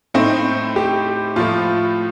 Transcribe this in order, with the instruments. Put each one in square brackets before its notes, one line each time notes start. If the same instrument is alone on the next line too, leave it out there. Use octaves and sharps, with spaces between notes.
[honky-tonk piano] A2 A3 C4 D#4
[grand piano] G4
[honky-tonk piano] A2 F3 A3 [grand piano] F4